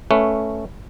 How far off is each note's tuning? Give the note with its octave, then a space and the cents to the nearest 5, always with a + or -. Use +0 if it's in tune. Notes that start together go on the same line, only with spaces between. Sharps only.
A3 +0 C#4 +0 B4 +0